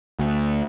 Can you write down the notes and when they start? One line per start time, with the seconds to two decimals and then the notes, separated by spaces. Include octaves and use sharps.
0.19 D2